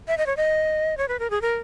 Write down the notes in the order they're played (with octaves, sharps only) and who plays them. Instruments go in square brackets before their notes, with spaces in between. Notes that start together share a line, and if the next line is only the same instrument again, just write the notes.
[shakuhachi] E5
D#5
C#5
D#5
C#5
B4
A#4
G#4
A#4